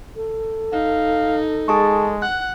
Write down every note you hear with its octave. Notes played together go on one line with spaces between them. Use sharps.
A4
D#4 F5
G#3 G#4 A5 C#6
F#5 F#6